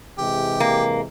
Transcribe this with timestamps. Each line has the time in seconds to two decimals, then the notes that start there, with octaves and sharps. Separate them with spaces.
0.19 C3 E3 G#3 G4
0.60 A#3